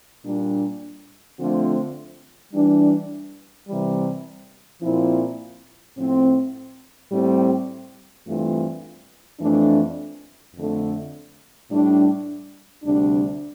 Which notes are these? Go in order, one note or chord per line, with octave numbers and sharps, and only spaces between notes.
A#2 G3 D4
D3 F3 A3 C4 F4
E3 G3 D4
C3 E3 G3
A#2 F3 C4 E4
A2 F3 C4
A2 G3 C4 G4
G2 E3 A3 C4 F4
F2 E3 A3 D4
F2 D3 A3
A2 G3 D4
D2 C3 G3 D4